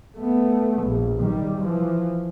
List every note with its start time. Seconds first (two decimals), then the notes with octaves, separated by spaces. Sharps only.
0.18 A3 B3
0.83 A#1
1.19 D#3 G3
1.58 E3 F3